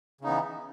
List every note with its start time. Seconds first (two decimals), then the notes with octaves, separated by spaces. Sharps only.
0.21 C#3
0.24 D#4
0.26 B3
0.29 E3